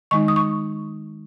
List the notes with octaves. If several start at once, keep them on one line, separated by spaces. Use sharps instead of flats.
D#3 G#3 D#4 C#6
D#6
C#6